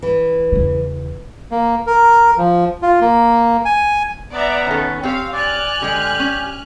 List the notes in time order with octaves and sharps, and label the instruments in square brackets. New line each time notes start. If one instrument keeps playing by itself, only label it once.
[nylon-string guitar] E3
[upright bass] E2 C#3
[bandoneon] A#3
A#4
F3
F4
A#3
G#5
[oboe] B3 [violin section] D5 E5 A#5
[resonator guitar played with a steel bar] D#3 A4 [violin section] C#4
[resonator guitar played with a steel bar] C4 G4 C#5 [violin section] F5
[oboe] D5 [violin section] G#5 F6 F#6
[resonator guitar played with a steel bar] D3 G#3 [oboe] G4
[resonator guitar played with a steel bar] C#4